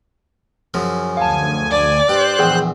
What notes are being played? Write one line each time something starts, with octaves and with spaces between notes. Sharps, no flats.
F#2 C#3 F3
D2 F5 G#5 A5
D5
G2 G4 C5 F#6
A#1 E2 G#4 G5